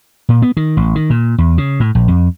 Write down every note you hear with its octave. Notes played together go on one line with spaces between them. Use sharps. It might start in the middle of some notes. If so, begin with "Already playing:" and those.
A#2
B3
D#3
A1
D#3
A#2
E2
C#3
A2
A#1
F2